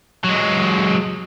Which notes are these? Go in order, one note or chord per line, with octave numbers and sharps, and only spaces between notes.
F#3 G#3